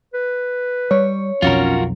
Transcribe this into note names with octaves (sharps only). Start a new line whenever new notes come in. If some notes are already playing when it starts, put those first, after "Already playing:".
B4
G3 C#5
B1 F2 C#4 F4 F#4 A#4